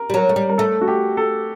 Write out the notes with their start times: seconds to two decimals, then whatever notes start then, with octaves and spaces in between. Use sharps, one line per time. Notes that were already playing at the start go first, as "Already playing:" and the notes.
Already playing: A#4
0.10 G3
0.14 F#3 A#4
0.29 A3
0.36 G3
0.49 A#4
0.58 A3 A4
0.81 F#4
0.88 G4
1.17 A4